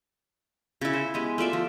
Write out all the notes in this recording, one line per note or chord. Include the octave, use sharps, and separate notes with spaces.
C#3 E4
C5
G#3 B3 G4
A3 F4 D5 E5
F3